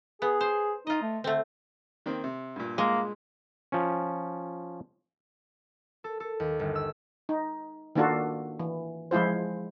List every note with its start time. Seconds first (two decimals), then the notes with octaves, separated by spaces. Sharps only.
0.22 B3 G#4
0.41 C5
0.87 D#4 F4 D#5
1.02 A3
1.24 D3 A3 C4
2.06 D#3 A#3 C4
2.24 C3
2.56 G2 A#2
2.78 G#3 A#3
3.72 F3 C#4
6.04 A4
6.20 A4
6.40 D#2
6.59 G1
6.75 E6
7.29 D#4
7.95 D#3 A#3 D4 F4 F#4 A4
8.59 E3
9.11 F3 G#3 E4 F4 C5